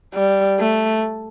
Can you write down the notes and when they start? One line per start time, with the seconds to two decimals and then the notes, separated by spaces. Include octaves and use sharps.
0.14 G3
0.60 A3